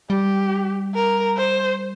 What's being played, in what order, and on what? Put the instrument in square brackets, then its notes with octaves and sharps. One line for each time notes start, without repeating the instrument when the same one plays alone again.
[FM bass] G3 [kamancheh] G4
[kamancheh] A#4
C5